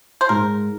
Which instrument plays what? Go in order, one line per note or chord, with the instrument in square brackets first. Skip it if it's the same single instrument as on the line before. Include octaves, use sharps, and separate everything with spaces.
[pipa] C5
[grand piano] G#2 [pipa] A#4